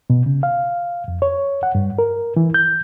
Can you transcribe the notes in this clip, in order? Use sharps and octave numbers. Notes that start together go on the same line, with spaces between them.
B2
C#3
F5
F2
C#5
F#5
G2
A#4
E3
G6